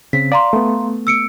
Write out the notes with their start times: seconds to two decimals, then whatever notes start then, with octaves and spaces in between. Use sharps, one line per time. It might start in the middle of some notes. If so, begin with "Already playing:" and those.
0.13 C#3 C4 B6
0.32 D5 F5 A#5 C6
0.53 A3 B3
1.07 E6 C#7 D7